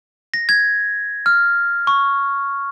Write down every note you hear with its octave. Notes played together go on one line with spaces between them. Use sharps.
A#6
G#6
F6
C#6